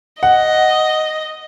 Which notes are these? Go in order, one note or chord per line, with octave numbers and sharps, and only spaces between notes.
D#5 F#5